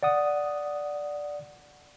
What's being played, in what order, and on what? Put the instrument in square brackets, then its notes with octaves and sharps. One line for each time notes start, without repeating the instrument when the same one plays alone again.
[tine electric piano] D5 F#5 D#6